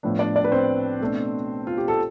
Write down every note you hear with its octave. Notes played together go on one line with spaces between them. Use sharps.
A2 F3 B3 D4
D4 D5
D4 D5
B4
C4 C5
B2 A3 D4
F4
G4
A4